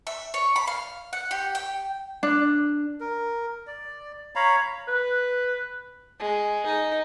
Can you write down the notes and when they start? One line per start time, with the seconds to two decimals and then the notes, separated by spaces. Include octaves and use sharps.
0.07 E5
0.34 C#5
0.56 B5
0.67 F5
1.13 F#5
1.31 G4
1.55 G5
2.23 D4
3.00 A#4
3.67 D5
4.35 C#5 F5 A#5 B5
4.88 B4
6.19 G#3
6.66 D#4